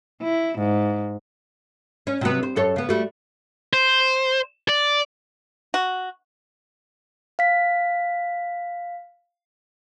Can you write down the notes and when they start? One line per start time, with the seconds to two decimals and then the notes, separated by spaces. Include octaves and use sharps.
0.22 E4
0.58 G#2
2.07 C#4
2.21 C3 F#3 B3
2.43 C5
2.56 F#2 A4 C#5
2.76 C#3 B3
2.89 G3 A3 F#4
3.73 C5
4.69 D5
5.74 F#4
7.39 F5 B6